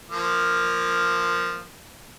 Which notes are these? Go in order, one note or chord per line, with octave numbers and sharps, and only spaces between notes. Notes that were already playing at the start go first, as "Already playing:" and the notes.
F3 A#3